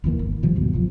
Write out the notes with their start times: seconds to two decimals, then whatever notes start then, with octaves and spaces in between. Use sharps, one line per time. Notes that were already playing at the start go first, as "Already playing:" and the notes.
0.04 F1 D#2 E3 A#3
0.19 G1
0.43 A#2 D#3 F3 G3
0.55 D2 G2 B2 F#3
0.73 F#1 B1 F3